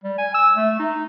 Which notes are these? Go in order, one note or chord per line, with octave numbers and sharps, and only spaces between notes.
G3
G#5
E6
A3
D#4